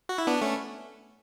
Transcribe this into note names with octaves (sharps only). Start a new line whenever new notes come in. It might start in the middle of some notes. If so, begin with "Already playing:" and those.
F#4
E4
B3 D4
A3 C#4